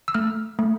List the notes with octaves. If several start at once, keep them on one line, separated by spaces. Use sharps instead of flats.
E6
A3 F6
A3